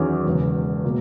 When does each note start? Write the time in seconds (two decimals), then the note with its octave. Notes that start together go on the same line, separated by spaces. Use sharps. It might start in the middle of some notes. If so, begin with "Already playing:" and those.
Already playing: E2 D#3 F#3 C#4 G#4
0.26 E1 E2 C#3
0.85 B2 A#3